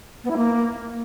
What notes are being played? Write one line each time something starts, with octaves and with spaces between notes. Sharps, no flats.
B3
E4
A#3